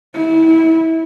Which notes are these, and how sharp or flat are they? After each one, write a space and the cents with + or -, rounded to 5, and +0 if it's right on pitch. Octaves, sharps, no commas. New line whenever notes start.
E4 -25